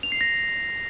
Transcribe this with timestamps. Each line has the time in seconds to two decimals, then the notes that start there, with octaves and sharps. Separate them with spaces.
0.03 F7
0.12 C7
0.21 A#6